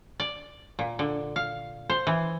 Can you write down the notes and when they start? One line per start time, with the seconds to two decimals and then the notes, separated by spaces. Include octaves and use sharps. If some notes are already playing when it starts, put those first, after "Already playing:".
0.20 D5
0.79 A#2
0.99 D3
1.36 F5
1.90 C5
2.07 E3